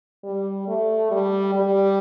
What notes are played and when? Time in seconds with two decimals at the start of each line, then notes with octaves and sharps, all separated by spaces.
0.24 G3
0.68 A3
1.11 G3
1.55 G3